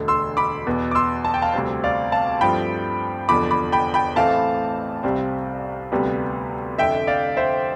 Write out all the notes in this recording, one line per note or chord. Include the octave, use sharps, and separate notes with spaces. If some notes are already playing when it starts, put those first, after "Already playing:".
Already playing: E1 D2 D3
C6 E6
B5 D6
E2 B2 B3
D6
C6 E6
A5
G5
F5 A5
D2 C3 G3 C4
D5 F5
F5 A5
G2 F3 A3 C4 G5 B5
F1 E2 D3 F3 B5 D6
B5 D6
G5 B5
G5 B5
A1 A2 E3 A3 C4 F5 A5
C2 C3 G3 C4
D2 C3 G3 B3
F1 F2 D3 E5 G5
D5 F5
C5 E5